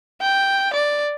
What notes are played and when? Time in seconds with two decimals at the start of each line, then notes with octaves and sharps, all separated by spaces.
0.21 G5
0.74 D5